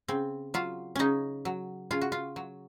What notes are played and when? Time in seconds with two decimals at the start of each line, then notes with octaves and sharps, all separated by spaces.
0.08 C#3 C4
0.54 F#3 F4
0.95 C#3 C#4 D#4
1.45 F#3
1.91 C#3 F4
2.01 F#4
2.12 F4
2.36 F#3